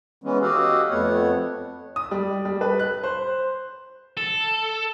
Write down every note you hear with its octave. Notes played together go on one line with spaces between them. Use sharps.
E3 G#3 B3 C#4
F#4 G4 A4 D#5 F5 F#5
F2 A3 B3 C#5 F#5
D#6
G3
G3
B4
F#6
C5
A4